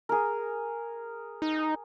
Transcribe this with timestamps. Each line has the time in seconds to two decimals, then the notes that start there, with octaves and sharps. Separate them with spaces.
0.09 G#4 A#4
1.42 D#4